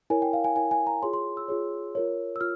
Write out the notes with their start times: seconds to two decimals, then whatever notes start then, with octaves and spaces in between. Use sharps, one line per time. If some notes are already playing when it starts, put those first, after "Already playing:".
0.10 E4 A#4 C#5 G#5
0.22 G5
0.33 F5
0.44 G#5
0.56 E4 A#4 C#5 G#5
0.71 G#5
0.87 A#5
1.02 F4 G#4 C#5 C6
1.13 C6
1.37 E6
1.48 F4 G#4 C#5
1.95 F4 A#4 C#5
2.36 E6
2.41 F4 F6